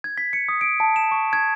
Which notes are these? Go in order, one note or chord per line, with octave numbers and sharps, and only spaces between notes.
G#6
B6
C#7
D#6
D7
A5
E7
C#6
G#6